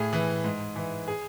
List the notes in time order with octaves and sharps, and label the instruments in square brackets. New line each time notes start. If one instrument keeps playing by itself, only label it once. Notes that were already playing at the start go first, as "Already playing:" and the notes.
Already playing: [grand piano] A2 G#4
E3
G#2
E3
G#4